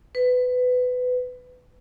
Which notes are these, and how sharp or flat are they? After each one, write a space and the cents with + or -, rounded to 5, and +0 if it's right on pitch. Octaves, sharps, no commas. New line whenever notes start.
B4 +20